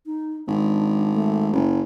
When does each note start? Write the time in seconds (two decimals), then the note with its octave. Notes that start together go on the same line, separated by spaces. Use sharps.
0.06 D#4
0.47 G#1 D4
1.12 A3
1.53 F#1